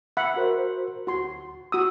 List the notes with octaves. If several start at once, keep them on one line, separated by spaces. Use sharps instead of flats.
E5 F#5 B5
F#4 A#4 C5
D2 F#4 C6
F#4 D#6 E6